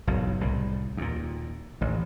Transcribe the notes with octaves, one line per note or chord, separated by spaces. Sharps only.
F#1 B1 A2
C2 A2
D#2 A#2
A1 D#2